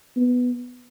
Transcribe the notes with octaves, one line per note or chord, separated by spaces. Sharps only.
B3